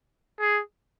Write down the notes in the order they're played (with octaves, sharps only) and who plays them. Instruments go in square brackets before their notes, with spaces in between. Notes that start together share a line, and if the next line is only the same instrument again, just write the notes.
[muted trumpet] G#4